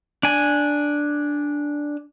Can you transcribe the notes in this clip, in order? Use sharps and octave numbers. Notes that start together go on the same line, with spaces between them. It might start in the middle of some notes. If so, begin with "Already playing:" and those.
D4 G#5